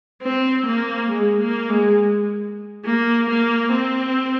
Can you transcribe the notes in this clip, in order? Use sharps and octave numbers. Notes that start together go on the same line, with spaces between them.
C4
A#3
G#3
A#3
G#3
A#3
A#3
C4